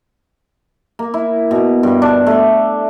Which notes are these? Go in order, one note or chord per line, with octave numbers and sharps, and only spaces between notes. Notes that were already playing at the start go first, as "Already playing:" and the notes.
A#3
E4
B2
G2
D4
A3